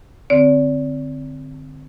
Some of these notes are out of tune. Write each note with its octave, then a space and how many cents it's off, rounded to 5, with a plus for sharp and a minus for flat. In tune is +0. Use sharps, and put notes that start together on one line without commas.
D3 +10 C4 -5 D5 -35